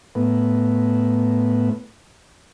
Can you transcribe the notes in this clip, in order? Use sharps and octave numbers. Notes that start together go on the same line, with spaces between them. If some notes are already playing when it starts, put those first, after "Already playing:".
A2 B3